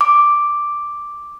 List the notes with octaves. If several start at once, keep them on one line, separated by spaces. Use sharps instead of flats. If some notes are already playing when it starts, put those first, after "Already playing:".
D6